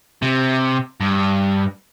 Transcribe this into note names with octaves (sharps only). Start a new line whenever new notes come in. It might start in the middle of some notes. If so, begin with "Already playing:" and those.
C3
G2